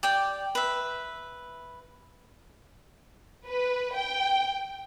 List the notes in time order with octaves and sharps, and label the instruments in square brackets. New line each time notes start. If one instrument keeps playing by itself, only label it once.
[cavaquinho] G4 D5 G5
B4 E5
[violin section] B4
G5